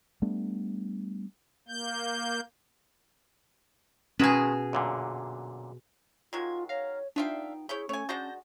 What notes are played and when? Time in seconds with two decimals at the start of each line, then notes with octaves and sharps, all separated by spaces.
0.22 G3 A3 B3 D4
1.68 A#3 G6
4.19 B2 D#3 G#3 C#4 G#4 B4
4.73 F#2 A#2 D3
6.33 D#3 F#3 G#3 F4 G#6
6.69 C#5 F5 A#5
7.16 B3 D4 D#4 F4 E5 F5 G5
7.69 C#4 E4 G#4 C#5 G6
7.89 A3 C#4 C#5 G#5
8.09 G#3 D4 F#4 A5 G6 A#6